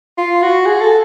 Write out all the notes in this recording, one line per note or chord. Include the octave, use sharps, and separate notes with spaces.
F4
F#4
G#4
A4